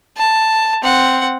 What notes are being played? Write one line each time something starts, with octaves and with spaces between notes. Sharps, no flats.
A5
C4 F#5